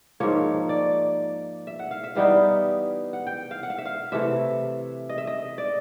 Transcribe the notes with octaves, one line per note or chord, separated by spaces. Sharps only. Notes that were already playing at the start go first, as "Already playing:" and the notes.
G#2 F3 A#3 C#5
D5
E5
F#5
F5
E5
E3 G3 B3 D#4 F5
F#5
G5
F5
F#5
F5
E5
F5
C3 E3 A3 E5
D#5
E5
D#5
D5